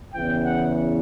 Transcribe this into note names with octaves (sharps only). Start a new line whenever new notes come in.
E2 C#3 E3 G5
F#5